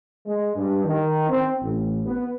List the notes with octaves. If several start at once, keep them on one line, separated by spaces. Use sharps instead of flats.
G#3
G2
D#3
C4
A1
B3